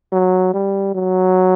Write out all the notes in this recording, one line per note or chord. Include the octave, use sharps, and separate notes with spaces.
F#3
G3
F#3